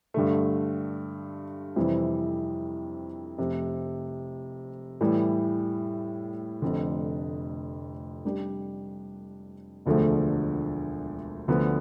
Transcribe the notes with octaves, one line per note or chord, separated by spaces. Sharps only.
G2 D3 A3
F2 C3 E3 G3 C4
F1 F2 C3
A2 E3 G3
F1 F2 D3
C3 G3 D4 G4
E1 D2 D3 F3 A3
D2 D3 F3 B3